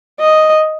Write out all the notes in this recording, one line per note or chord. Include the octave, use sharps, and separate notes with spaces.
D#5